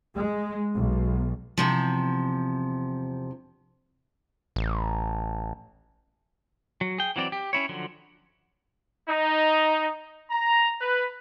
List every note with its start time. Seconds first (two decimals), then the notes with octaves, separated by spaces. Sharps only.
0.15 G#3
0.74 B1
1.58 E2 C3 F3
4.56 A1
6.81 F#3
6.98 G#4 G5
7.16 E3 F#3 C4 D5
7.32 G4
7.53 C#4 E4 C#5
7.69 D3 F3 F#3
9.09 D#4
10.31 A#5
10.81 B4